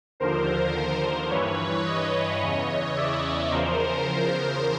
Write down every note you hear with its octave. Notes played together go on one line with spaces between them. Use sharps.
D#2 D3 F3 A#4 C5
G2 E3 B4 C#5
C#5 D#5
E2 C#3 E3 C#5 D#5
D5 E5
E2 C#3 F3 A#4 C5
A#4 C5